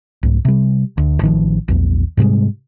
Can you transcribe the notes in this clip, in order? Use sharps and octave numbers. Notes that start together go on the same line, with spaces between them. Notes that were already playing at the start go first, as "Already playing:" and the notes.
C2 G#2
C3 G3
D2
A1 D#3 F3
A#1 E2
G#2 C3 G3 G#3